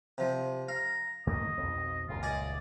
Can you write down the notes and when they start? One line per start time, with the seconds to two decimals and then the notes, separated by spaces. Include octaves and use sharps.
0.18 C3 F3
0.68 F5 A#5
1.27 D#2 A3 A#3 D#5
1.57 B1 F2
2.09 D#1 C#2 F#2 F4
2.23 G#4 D5 D#5